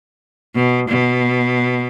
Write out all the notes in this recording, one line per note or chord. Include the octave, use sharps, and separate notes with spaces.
B2
B2